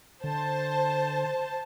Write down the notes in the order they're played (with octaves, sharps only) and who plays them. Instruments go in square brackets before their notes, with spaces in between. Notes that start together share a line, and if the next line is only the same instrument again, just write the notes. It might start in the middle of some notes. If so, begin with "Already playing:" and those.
[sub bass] D3 [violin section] C5 A5